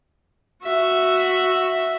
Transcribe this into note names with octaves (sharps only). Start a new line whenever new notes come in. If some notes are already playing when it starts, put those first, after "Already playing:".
F#4 E5